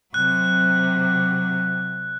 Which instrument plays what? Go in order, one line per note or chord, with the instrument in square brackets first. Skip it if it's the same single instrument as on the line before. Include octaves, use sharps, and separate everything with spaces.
[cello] C3 F#3 [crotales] F#6